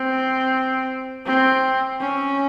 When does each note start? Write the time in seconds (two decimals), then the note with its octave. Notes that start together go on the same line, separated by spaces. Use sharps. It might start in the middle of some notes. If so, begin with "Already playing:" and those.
Already playing: C4
1.26 C4
2.00 C#4